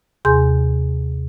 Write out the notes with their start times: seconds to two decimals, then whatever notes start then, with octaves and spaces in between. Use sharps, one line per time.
0.25 D#2 C3 G#4 G#5 C6 G6